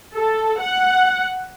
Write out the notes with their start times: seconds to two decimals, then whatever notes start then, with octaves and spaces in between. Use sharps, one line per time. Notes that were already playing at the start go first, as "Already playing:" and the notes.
0.15 A4
0.60 F#5